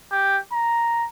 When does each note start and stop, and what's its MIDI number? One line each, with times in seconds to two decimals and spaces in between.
0.12 0.38 67
0.52 1.07 82